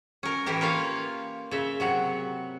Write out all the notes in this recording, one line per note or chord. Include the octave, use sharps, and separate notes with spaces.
C#4 A#4
A2 E3 E4 G4
A#3 F4 C#5 F5
C#3 E5
C3 F#3 F#5